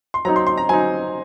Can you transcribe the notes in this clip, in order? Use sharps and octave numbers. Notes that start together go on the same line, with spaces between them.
C6
F#3 C4 D#4 A#5
C6
C6
A#5
F#3 C4 D#4 G#5